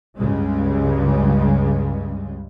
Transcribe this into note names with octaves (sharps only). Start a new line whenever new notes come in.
C#2 G2 C#3 G3 G#3